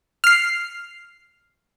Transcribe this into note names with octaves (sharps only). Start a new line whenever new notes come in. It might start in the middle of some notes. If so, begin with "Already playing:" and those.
F6 C7